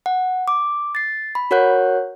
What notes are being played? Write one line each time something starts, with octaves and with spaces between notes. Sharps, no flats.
F#5
D6
A6 C7
B5
F#4 A#4 C#5 F#5 F#6 G6